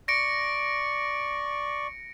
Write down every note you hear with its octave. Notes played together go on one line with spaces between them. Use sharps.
D5 C#6 A#6 C#7 D7